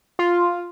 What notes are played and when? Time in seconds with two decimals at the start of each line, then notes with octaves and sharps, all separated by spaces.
0.19 F4